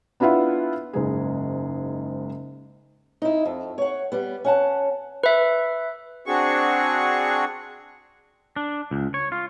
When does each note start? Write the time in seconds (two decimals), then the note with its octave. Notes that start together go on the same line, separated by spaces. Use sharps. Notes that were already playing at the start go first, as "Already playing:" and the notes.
0.20 B3 D4 E4 F4 E5 F#5
0.93 F#1 G#2 G#4
3.22 D#4 E4
3.45 F2
3.78 C#5 F#5
4.12 G3 B3
4.44 C#4 F#5 A5
5.24 B4 E5
6.26 C4 D4 F#4 G#4 C#6
8.56 D4
8.91 C#2
9.14 C#5
9.32 F4